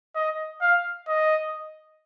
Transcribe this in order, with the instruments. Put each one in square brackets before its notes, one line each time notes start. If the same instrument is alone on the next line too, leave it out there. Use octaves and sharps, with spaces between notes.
[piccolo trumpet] D#5
F5
D#5